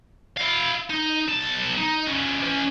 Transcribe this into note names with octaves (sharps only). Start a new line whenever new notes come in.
E4 F5
D#4
B1 A5
D#4
F3 C#4
E3 C#4